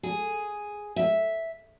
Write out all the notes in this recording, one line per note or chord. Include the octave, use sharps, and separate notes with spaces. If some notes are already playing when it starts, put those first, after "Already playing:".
G#4
E5